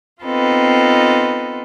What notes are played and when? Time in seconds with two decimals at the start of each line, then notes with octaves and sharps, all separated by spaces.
0.24 B3 C4 D#4 F4 A4 B4